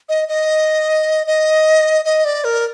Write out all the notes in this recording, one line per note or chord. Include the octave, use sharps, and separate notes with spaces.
D#5
D#5
D#5
D#5
D5
A#4